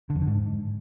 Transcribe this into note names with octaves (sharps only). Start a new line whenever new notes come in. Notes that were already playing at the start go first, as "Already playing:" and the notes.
D3
F2
D3
G#2